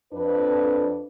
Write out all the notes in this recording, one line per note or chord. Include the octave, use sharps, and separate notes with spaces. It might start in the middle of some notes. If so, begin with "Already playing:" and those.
F2 D4 B4